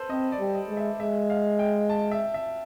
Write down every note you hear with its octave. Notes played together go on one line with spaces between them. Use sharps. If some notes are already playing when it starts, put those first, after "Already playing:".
Already playing: A4 B4 C5
C4 D#5
D5
G3
D#5
G#3
E5
G#3 E5
F5
G5
A5
E5
E5